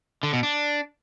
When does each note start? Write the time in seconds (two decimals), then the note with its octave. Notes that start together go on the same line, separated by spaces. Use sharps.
0.23 D3
0.33 B2
0.43 D4